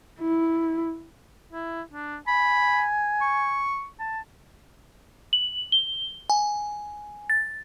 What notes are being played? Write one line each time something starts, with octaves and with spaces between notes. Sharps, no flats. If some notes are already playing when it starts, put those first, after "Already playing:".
E4
E4
D4
G#5 B5
C#6
A5
F#7
G7
G#5
A6